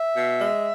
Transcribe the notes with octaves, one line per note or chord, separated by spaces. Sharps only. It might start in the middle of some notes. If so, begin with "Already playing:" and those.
Already playing: E5
B2
G#3